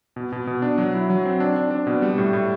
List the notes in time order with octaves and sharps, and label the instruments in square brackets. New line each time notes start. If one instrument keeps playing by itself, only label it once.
[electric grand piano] B2
B2
B2
D4
F#3
E4
F#3
C4
D4
D4
D4
B2
G3
A2
A2